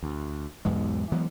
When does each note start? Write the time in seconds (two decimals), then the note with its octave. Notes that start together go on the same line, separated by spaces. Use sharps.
0.03 D2
0.65 B1 E2 G#2 G#3
1.12 E3 F#3 G#3 B3